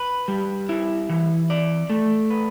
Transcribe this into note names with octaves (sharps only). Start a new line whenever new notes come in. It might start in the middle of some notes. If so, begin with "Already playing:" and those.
Already playing: B4
G3
E4
E3
D5
A3
B4